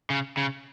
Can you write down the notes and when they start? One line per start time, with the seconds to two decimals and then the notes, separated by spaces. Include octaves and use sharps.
0.10 C#3
0.37 C#3